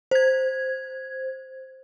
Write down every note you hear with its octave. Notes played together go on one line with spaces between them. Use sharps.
C5 G#6